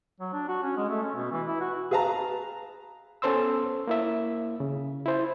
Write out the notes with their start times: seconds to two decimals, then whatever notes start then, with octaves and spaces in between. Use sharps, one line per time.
0.21 F#3
0.33 D4
0.48 F#4
0.63 C#4
0.77 G#3
0.89 A3
1.03 C#4
1.15 B2
1.32 E3
1.47 E4
1.61 F#4
1.91 G#4 B4 F5 A5 A#5
3.22 B3 C#4 A4 C5 C6 E6
3.87 A#3 E4 E5
4.60 C#3
5.06 E4 C5